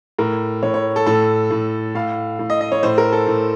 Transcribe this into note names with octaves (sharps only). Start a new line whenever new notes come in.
A2 A#4
A2 C#5
C#5
A4
A2 A4
A2
A2 F5
A2
D#5
D#5
C#5
A2 C5
A#4
A4
A2